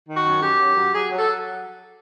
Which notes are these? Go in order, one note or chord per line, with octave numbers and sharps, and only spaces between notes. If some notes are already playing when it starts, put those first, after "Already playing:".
D#3
F#4
F#2
F#2 G4
F#3
F#3
F#3 G#4
F#3
A4
F#3